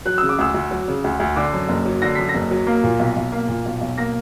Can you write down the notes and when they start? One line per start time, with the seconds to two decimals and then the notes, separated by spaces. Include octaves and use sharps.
0.06 F#3 F#6
0.18 C#3 E6
0.29 D6
0.39 D2 E6
0.54 D2
0.71 F#3
0.88 C#3
1.04 D2
1.20 D2
1.36 D3 D6
1.53 F#2
1.69 F#1
1.85 F#3
2.02 D3 A#6
2.15 F#2 B6
2.29 A#6
2.35 F#1
2.51 F#3
2.67 A#3
2.84 A#2
2.99 B1
3.16 B1
3.32 A#3
3.48 A#2
3.65 B1
3.81 B1
3.97 A#3 A#6